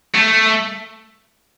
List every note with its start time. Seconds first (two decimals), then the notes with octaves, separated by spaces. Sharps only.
0.15 A3